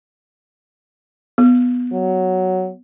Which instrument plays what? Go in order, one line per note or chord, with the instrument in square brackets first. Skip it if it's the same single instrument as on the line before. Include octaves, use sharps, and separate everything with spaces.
[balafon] B3
[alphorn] F#3